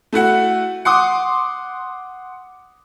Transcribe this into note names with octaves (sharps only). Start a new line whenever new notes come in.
A3 E4 F#4 F#5
F#5 C6 D6 D#6